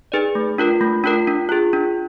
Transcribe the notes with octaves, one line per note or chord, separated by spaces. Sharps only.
D#4 G#4 B4 D5
A3
D4 F4 A#4
A3
D4 F4 A#4
D4
F4 G#4
D4